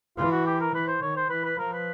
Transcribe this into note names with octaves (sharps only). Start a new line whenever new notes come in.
E3 F4
F#4
G4
A#4
E3 B4
C5
D#3 C#5
C5
E3 B4
B4
F3 A#4
B4